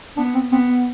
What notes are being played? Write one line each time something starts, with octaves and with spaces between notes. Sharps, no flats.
B3 D4
C4
B3 C4
B3